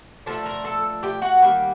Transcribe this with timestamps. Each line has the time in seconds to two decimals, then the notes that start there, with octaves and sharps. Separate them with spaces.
0.26 D3 F3 A3 D4 A4 A5
0.45 A#4 A#5
0.64 A4 A5
1.03 G4 G5
1.22 F#4 F#5
1.42 D#3 G3 A#3